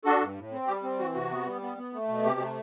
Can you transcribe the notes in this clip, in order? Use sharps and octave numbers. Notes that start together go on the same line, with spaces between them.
D4 F#4 A4
G2
A2
C4
G3 G4
C4
E3 F#4
C3 F#4
B3
G3
B3
B3
A3
B2
C3 G4
A3